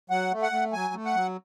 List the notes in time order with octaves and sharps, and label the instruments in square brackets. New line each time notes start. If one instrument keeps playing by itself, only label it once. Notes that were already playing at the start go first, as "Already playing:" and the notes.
[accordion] F#3 F#5
A3
F#5
A3
F#3 G#5
A3
F#5
F#3